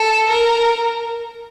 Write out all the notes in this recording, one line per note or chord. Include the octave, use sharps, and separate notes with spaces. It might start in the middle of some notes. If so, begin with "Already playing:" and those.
Already playing: A4
A#4